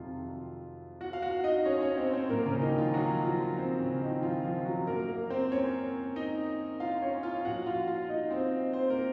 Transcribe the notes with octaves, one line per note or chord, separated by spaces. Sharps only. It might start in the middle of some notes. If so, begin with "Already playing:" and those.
Already playing: F2 C3 D#3 F#3 F4 F5
F#4 F#5
F5
F#4 F#5
D#4 D#5
C#4 C#5
C#4 C#5
C4 C5
C4 C5
A#2 F#3 A#3 A#4
C#3 C#4
D#3 D#4
F3 F4
F#3 F#4
F3 F4
C4
C#3 C#4
D#3 D#4
F3 F4
F3 F4
F#3 F#4
F#2 F3 A#3 A#4
A#3 A#4
C4 C5
C#4 C#5
D#4 D#5
F4 F5
C#4 C#5
F4 F5
A#2 F3 F#4 F#5
F4 F5
F4 F5
D#4 D#5
C4 C5
C4 C5
A#3 A#4